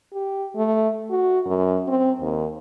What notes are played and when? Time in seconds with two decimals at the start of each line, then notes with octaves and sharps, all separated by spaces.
0.13 G4
0.56 A3
1.10 F#4
1.46 F#2
1.88 C4
2.21 D#2